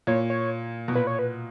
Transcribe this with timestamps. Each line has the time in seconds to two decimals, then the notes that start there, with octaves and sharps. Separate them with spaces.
0.07 A#2 C#5
0.30 C#5
0.88 B2
0.95 A#2 B4
1.07 C#5
1.19 B4